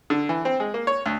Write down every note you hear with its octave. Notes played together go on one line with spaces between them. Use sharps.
D3
E3
C4
G#3
A#3
C#5
D2